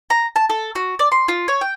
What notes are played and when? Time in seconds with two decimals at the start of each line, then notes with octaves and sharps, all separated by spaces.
0.10 A#5
0.36 A5
0.50 A4
0.75 F#4
0.99 D5
1.12 C6
1.28 F4
1.48 C#5
1.61 G5